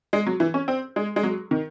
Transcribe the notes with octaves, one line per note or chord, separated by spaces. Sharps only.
G#3
F#3
E3
C#4
C4
G#3
G#3
F#3
D#3